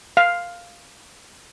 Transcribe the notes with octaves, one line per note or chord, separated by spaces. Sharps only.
F5